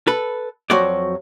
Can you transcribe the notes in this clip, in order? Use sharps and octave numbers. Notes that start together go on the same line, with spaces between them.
A4 B4
F2 F#3 F#4 C5 D5